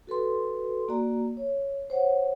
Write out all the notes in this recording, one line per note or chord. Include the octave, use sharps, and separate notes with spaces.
F#4 A4 B4 C6
A#3 F#4 D5 A#5
C#5
C5 C#5 F#5